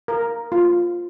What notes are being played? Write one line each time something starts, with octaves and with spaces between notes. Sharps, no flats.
A#4
F4